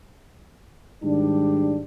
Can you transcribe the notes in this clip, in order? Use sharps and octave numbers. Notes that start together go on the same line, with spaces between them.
G#2 D#3 G3 D4